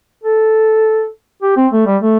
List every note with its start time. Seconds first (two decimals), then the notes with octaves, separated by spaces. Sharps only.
0.24 A4
1.43 G4
1.57 C4
1.73 A3
1.87 G3
2.02 A3